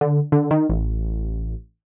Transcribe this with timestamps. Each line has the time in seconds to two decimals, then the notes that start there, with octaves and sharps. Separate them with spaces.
0.01 D3
0.32 D3
0.51 D#3
0.70 A1